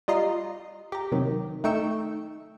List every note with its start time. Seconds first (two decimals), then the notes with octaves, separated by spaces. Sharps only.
0.08 G3 F4 D#5 A#5 C6
0.92 G4 A#5
1.12 C3 D#3 F#3
1.64 A3 D#4 G5 C#6 E6